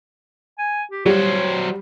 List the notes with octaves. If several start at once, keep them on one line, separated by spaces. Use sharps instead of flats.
G#5
G4
F#3 G3 C5 C#5